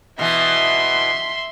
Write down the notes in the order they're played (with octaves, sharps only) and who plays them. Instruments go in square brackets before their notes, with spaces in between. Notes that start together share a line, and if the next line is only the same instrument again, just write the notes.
[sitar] B2 E3 [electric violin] E5 C6